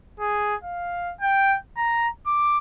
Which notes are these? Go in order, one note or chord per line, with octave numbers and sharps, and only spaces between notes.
G#4
F5
G5
A#5
D6